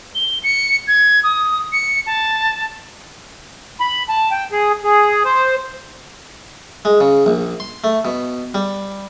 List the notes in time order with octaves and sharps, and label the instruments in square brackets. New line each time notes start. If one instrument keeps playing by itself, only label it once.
[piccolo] G7
C#7
G#6
D#6
C#7
A5
[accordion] B5
A5
G5
G#4
G#4
C5
[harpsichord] G#3
C#3
A#1
C6
A3
B2
G3